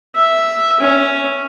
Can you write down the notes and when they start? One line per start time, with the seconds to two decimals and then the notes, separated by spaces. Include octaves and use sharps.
0.15 E5
0.80 C#4